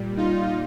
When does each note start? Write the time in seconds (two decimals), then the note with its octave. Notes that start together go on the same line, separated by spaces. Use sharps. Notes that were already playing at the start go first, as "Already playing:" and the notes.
Already playing: A#2 G3
0.17 D#4 F4